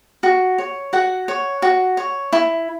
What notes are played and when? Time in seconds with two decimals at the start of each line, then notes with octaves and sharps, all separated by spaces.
0.23 F#4
0.58 C#5
0.93 F#4 F#5
1.28 C#5
1.62 F#4
1.97 C#5
2.33 E4